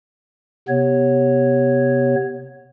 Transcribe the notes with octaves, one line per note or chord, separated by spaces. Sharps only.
C3 B3 C#5